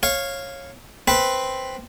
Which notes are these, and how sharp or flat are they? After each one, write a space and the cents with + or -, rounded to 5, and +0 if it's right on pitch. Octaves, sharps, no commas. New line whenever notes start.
C#5 -15 F5 +0
C4 +0 B4 +0